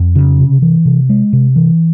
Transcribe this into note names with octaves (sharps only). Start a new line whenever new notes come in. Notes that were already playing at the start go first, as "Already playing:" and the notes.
Already playing: F2
C#3
C3
E3
C3
G#3
C3
E3